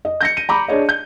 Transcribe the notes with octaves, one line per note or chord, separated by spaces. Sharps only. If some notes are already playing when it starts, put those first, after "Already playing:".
D#5
G6 A#6 C#7
D#7
A#5 B5 D6
D4 G#4 C#5 D#5
G6